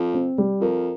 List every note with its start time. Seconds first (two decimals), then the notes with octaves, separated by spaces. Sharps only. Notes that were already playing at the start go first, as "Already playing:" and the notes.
Already playing: F2
0.14 C4
0.38 G3
0.61 F2 A#4